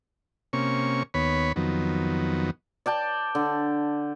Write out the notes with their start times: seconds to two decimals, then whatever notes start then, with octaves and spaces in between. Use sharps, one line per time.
0.53 C3 A#3 C#4 C#6
1.14 D#2 B3 C#5 B5
1.56 F2 D#3 F#3 B3
2.86 D5 G5 A5
3.35 D3